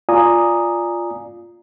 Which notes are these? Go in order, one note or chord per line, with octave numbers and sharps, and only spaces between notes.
F4 D5 G#5 A#5 D#6